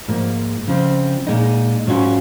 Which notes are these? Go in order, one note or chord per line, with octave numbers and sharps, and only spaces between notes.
G#2 F3 A#3
C#3 F3 C4
A#2 G#3 D#4
G#2 F#3 C#4 F4